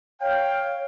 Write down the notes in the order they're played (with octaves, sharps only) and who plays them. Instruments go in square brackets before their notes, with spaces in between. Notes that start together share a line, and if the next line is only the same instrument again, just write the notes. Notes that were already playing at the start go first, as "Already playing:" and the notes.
[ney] C#5 [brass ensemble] F5 G5